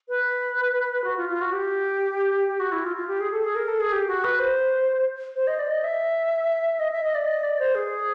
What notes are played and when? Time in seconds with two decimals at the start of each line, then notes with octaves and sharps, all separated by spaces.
0.08 B4
1.04 F#4
1.17 F4
1.29 F4
1.41 F#4
1.52 G4
2.48 G4
2.60 F#4
2.72 E4
2.84 F4
2.96 F4
3.08 G4
3.20 G#4
3.32 A4
3.44 G#4
3.56 A#4
3.68 A4
3.80 G#4
3.92 G4
4.08 F#4
4.24 B4
4.39 C5
5.36 C5
5.47 D#5
5.59 D5
5.71 D#5
5.84 E5
6.80 D#5
6.92 E5
7.04 D#5
7.15 D5
7.26 D#5
7.43 D5
7.59 C5
7.75 G#4